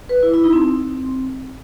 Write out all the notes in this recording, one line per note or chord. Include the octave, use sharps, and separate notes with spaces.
B4
E4
E4
D#4
C4